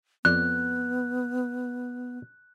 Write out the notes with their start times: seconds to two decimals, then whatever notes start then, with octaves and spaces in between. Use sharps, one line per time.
0.25 F2 B3 D5 F#6